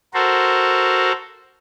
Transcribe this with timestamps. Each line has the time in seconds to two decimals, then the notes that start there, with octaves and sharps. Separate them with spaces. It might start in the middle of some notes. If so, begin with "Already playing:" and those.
0.14 F#4 A4 A#4 C5